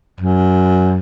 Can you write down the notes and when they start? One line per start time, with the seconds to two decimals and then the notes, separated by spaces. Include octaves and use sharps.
0.21 F#2